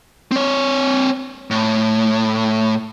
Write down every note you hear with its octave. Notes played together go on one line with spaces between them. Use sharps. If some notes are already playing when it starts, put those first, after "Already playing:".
C4 C#5
A2